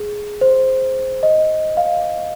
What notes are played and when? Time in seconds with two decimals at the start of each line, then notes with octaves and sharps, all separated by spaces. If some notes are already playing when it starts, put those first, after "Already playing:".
Already playing: G#4
0.41 C5
1.23 D#5
1.77 F5